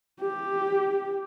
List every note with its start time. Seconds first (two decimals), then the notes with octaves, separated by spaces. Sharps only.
0.20 G4